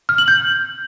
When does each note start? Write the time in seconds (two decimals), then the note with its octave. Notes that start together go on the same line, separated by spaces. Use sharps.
0.09 F6
0.18 F#7
0.28 G6